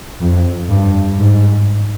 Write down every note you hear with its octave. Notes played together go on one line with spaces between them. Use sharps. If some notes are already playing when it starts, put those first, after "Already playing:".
F2
G2
G#2